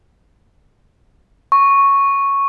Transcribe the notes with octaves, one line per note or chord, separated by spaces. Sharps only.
C#6